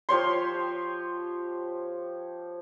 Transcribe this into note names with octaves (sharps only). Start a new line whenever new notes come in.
F3 G4 C#5 C6